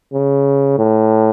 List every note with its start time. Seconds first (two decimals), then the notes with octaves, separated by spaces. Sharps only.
0.13 C#3
0.79 A2